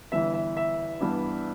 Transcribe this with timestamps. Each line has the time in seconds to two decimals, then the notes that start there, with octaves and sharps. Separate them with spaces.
0.12 G1 G2 E3 E5
0.34 E5
0.57 E5
1.01 G2 E3 B3 D4